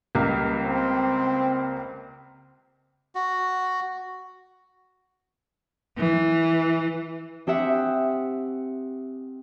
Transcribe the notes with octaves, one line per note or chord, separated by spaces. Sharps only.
C#2 G3 A#3
C4
F#4
E3
C4 G4 G#4 E5 F#5